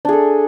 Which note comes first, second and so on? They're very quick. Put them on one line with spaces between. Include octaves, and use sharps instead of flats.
D4 G#4 A4